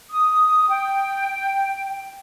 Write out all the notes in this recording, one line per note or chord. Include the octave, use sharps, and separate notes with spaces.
D#6
G5